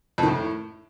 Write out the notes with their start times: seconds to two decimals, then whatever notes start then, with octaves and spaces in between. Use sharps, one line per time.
0.18 F2
0.23 D#3
0.28 A2